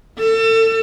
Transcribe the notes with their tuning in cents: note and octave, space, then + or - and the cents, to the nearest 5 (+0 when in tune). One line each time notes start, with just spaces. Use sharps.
A4 +30